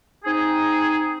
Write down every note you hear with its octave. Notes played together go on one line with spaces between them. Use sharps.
C4 D#4 G#4